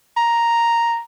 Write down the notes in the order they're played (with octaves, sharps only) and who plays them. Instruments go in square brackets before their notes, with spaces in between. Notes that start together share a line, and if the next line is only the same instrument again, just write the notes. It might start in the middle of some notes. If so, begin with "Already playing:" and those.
[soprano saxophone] A#5